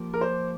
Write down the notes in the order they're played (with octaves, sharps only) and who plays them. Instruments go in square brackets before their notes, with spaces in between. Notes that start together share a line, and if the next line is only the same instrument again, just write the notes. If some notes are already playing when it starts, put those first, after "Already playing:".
Already playing: [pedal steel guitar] F3 A#3 G4
[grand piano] A#4
C5